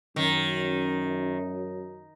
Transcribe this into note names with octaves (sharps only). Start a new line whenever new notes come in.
F#2 D#3